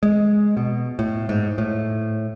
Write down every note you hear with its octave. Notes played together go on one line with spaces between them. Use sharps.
G#3
B2
A2
G#2
A2